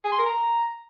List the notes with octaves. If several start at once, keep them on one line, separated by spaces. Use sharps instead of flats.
G#4
C6
A#4
A#5